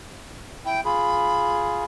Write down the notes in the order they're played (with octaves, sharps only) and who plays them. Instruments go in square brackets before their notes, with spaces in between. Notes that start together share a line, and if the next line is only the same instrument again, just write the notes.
[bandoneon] E4 [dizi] G5
[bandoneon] F4 G#4 [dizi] B5